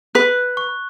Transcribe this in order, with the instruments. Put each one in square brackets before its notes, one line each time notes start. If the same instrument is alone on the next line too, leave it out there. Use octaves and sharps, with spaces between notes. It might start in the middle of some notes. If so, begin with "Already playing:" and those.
[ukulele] B4 [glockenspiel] F#6
[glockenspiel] C#6